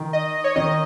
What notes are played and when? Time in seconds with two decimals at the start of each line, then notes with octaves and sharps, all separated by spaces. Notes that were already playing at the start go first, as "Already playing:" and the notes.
Already playing: D#3
0.13 D#5
0.44 C#5
0.56 D#3 D#5